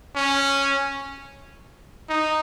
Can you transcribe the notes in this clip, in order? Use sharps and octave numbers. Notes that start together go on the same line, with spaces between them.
C#4
D#4